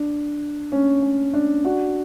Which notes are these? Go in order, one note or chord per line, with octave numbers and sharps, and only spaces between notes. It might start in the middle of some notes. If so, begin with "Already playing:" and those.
Already playing: D4
C#4
C#4
D4
D4 F#4